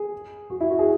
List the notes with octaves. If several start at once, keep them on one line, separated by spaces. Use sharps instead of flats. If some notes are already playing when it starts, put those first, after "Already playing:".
Already playing: G#4
F#4
E4
F#4
G#4